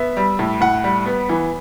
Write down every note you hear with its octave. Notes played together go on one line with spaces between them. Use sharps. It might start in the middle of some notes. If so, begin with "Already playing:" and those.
Already playing: B3 E5
G3
A2
A2 F#5
G3
B3
E3